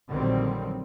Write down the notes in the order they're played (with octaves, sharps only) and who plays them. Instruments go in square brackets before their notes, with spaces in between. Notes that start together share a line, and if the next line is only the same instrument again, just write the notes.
[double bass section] A#1 D3 D#3 F#3 G3 C4